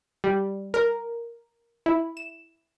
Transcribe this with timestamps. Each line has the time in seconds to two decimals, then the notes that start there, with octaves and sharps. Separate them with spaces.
0.24 G3
0.74 A#4
1.86 E4
2.17 E7